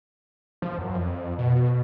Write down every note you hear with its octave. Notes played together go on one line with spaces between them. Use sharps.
F3
F#2
F2
B2